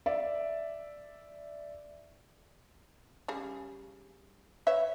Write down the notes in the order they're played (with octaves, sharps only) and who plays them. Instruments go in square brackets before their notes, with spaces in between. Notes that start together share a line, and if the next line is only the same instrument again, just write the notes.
[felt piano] D5 E5
[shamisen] C#3 G3 G#4
B4 C#5 E5